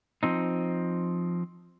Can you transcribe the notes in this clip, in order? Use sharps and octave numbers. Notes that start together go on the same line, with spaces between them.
F3 C4 D#4